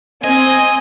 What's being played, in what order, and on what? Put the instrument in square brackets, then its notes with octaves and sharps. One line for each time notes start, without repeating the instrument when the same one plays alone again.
[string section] C4 G#5 [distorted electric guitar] D#5